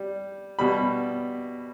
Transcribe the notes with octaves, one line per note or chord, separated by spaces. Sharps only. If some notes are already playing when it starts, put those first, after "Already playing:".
Already playing: G3
B2 G3 B5